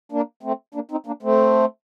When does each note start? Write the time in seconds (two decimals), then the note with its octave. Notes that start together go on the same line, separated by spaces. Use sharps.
0.12 A#3 D4
0.43 A3 C4
0.74 A#3 D4
0.91 C4 D#4
1.06 A#3 D4
1.23 A3 C4